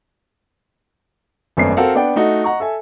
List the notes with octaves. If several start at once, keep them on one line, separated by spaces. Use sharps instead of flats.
G#1 F#2 A3 B3 D5 C7
C4 F#4 A4 A#4 F5 F#5
B3 D4 D5 F#5 G5
A3 D#4 F#4
D#5 F#5 A#5 C#6
A4 E5 G#5